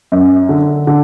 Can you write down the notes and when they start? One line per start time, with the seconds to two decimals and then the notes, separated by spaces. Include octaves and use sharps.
0.12 F#2
0.49 D3
0.87 D3